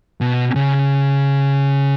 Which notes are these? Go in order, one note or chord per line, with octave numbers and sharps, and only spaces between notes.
B2
C#3